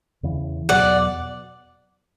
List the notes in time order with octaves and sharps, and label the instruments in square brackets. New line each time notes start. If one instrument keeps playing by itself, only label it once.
[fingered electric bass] E2 C#3 E3
[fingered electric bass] E2 B2 F#3 B3 [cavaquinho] D5 F#5